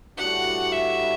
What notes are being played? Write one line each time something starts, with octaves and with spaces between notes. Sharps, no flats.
A2 G3 D4 F#4 F#5
E5